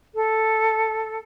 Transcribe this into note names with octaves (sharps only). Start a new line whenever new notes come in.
A4